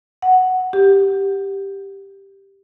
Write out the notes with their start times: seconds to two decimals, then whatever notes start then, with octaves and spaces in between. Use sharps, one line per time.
0.22 F#5
0.73 G4